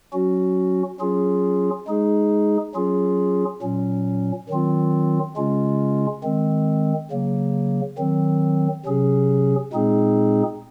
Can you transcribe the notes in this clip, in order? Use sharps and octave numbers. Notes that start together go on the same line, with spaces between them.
F#3 C#4 F#4
F#3 C#4 F4 G#4
G#3 D#4 G#4
F#3 C#4 F4 G#4
A#2 F#3 C#4
D#3 F#3 C4 F4
C#3 G#3 C#4 F4
D#3 G#3 C4
C#3 F#3 A#3
D#3 F#3 C4
C3 F#3 C#4 G#4
A#2 G#3 C4 D#4 G#4